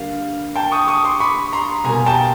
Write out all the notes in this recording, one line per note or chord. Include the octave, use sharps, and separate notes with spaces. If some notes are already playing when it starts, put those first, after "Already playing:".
Already playing: D3 G3 A#3 F5
G5 A5
C#6 D#6
C#6 D#6
C6 D6
B5 C#6
A#5 C6
B2 G3 A#3 G#5 A#5
G5 A5